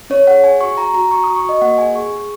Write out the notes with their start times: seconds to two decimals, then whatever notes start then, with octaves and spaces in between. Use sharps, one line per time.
0.10 C#4 C#5
0.27 G#4 F#5
0.44 G#4 G#5
0.61 F#4 C#6
0.77 F#4 A#5
0.94 F#4 A#5
1.11 F#4 C#6
1.24 F#4 D#6
1.36 C#6
1.44 F#4 D#5
1.61 A#3 F#5
1.78 G#4 G#5
1.95 G#4 C#6
2.12 G#4